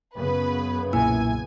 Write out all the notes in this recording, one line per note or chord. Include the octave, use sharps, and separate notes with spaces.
F#2 C#3 B3 B4
B1 A#2 A#3 E4 G#5 E6